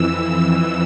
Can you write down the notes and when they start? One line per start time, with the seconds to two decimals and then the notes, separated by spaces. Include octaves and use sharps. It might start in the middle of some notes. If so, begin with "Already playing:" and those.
Already playing: F2 E3 E6
0.49 E6